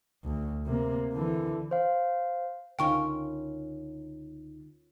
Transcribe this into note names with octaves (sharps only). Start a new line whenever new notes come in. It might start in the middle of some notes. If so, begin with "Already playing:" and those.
D2
C3 A#3
D3 E3
C5 F5
C#2 D3 C#4 D#4 F4 A#4 G5 C#6